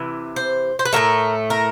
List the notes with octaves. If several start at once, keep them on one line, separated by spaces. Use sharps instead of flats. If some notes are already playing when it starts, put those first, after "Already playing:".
Already playing: C3 E3
C5
C5
B4
A2 E3 A3 A#4
A#4